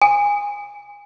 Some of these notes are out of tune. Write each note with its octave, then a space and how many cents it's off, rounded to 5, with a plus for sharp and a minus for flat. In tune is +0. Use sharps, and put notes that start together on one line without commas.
G#5 -20